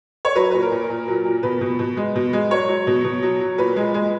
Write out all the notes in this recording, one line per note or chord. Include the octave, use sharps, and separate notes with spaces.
C#5
F#3 B4
A#2 B4
A#4
A#2
A#2
F#3
A#2
B2 B4
B2
B2
G#3
B2
G#3
F#3 C#5
F#3
B2
B2
F#3
F#3
A#2 B4
G#3
G#3